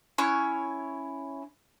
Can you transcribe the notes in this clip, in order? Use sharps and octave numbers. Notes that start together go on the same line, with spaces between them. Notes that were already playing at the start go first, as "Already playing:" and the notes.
C#4 E4 C#5 F#6